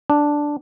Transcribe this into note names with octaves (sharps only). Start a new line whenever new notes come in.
D4